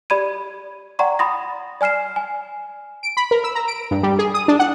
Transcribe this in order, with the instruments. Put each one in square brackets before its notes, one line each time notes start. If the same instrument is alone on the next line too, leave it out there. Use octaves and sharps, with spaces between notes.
[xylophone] G4 D5 B5 G#6 D#7
D5 F#5 G5 A#5 C6 C#6
F#5 B5 C6 D#6 A6 A#6
D5 G#5 F6 C7 E7
G#5
[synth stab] D7
B5
A#4
E6
A#5
D7
G2
G3
G#4
D#6
D4
F#5